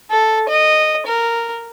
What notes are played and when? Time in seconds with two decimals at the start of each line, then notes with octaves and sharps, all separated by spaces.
0.11 A4
0.49 D#5
1.06 A#4